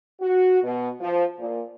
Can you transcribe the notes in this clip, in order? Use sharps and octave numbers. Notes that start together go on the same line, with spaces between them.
F#4
B2
F3
A#2